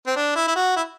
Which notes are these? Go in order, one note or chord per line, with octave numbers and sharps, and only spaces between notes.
C4
D4
E4
E4
F#4
E4